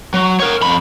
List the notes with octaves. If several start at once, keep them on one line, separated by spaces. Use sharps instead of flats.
F#3
A#4 C#5
F2 B5